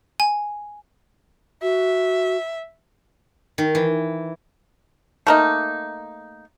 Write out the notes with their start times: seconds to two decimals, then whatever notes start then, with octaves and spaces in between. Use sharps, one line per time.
0.20 G#5
1.62 F#4 E5
3.58 D#3
3.75 E3
5.27 A3 A#3 D#4